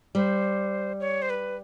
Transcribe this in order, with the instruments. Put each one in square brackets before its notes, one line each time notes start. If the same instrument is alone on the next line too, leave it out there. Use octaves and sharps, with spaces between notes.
[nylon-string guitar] G3 [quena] C5
[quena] C#5
C5
B4